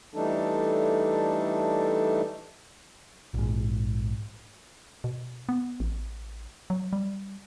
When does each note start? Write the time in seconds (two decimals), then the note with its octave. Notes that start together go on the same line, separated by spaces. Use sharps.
0.14 E3 G3 A3 D4 D#4 A4
3.34 A#1 G#2
5.04 B2
5.49 B3
5.80 A1
6.70 F#3
6.93 G3